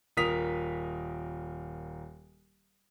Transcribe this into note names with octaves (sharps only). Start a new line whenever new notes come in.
D#1 A#4 D#6 B6 F7